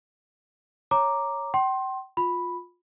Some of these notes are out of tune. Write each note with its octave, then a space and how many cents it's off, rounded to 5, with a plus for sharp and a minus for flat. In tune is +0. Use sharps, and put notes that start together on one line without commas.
C#5 +0 A#5 +0 D6 +0
G5 -35 C6 +20
F4 +20 B5 +0